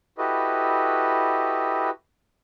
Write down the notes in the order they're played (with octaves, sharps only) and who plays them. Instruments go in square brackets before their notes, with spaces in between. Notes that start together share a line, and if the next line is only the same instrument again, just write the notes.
[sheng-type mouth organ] E4 F#4 G4 A4 B4 D#5